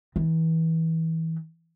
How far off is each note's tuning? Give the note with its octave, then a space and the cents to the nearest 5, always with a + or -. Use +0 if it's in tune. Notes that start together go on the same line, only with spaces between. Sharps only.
E3 -30